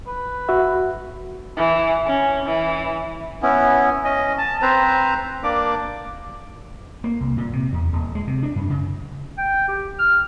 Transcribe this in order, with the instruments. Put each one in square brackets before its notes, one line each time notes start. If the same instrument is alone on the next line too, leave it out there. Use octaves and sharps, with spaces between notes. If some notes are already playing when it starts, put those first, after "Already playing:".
[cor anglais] B4
[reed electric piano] F#4 E5
[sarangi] E3
C#4
E3
[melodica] B3 C#4 E4
C#4 D#5
A5
C4 B4 C5 A#5
A#3 D4 D5 D6
[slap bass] A#3
C2
A#2
C3
E2
D#1
G#3
C3
D4
F#2
C#3
[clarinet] G5
G4
F6